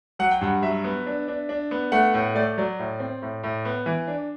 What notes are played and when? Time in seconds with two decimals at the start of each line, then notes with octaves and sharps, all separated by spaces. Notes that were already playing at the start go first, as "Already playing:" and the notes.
0.19 F#3 F#5
0.31 G5
0.41 G2 F#5
0.62 F#3 E5
0.84 B3
1.06 D4
1.28 D4
1.49 D4
1.71 B3
1.92 A3 F#5
2.14 A2
2.35 A3 D5
2.58 F#3 D5
2.79 A2
3.00 C4
3.22 A2
3.43 A2
3.65 B3
3.86 E3
4.08 D4